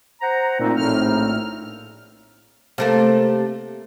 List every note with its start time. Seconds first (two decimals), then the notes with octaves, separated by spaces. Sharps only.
0.21 C5 F#5 A#5
0.59 A#2 A3 C4 D#4
0.76 A#1 A2 F6
2.78 C3 A3 A#3